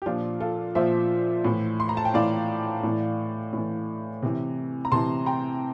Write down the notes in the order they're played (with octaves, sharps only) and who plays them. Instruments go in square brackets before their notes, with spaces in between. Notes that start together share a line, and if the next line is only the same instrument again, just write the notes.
[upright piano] G4
A#2 F3 D4 F4
F4 A4
A#2 F3 C5 E5
A2 E3
C6
A#5
A5
G5
A2 E3 D5 F5
A2 E3
A2 E3
C3 E3
A#5
C3 E3 A5 C6
G5 A#5